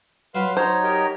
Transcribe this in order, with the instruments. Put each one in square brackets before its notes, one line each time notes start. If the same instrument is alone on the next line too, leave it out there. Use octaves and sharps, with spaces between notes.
[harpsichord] F#3 [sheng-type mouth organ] B4 F5 C6
[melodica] D#4 C#5 [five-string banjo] C5 [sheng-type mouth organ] A#5
[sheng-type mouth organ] G4 A#4 D#5